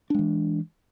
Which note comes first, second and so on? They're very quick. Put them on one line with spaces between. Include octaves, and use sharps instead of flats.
D4 G#3 E3